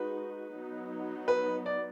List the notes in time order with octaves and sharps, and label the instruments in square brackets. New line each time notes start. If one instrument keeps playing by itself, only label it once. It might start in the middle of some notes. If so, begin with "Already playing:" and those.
Already playing: [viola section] G#3 D#4 F#4 [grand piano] B4
[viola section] F#3 B3 D#4
[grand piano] B4
D5